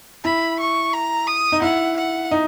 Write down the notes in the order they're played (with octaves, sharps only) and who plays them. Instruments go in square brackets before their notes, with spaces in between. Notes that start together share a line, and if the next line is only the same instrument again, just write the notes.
[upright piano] E4 [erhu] B5
[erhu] C#6
A#5
D#6
[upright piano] D#4
[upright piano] E4 [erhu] F#5
[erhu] F#5
[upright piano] D#4